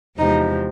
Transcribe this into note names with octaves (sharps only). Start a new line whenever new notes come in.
E2 C3 F3 G#3 D#4